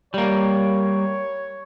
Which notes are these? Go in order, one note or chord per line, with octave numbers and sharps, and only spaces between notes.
G3 A#3 C#5